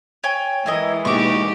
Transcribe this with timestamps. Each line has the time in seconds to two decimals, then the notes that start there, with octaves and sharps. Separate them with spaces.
0.24 C#5 G5 G#5
0.66 E3 G#3 E4 A#4 D#5
1.05 E1 A#3 D#4 G4 C#6 D6